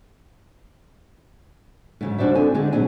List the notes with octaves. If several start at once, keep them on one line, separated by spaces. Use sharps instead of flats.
G#2 C#3 F#3
G3 D4 F#4 C5 D5 E5
C4 D4 A4 G#5
D3 G#3 D4 D#4 G#4
B2 F#3 G3 C4 G#5